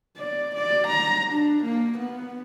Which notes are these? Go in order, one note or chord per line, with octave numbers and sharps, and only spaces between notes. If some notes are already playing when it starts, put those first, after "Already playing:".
D5
D5
A#5
D4
A#3
B3